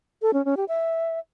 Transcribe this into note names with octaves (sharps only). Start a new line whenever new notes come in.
A4
C#4
C#4
G4
E5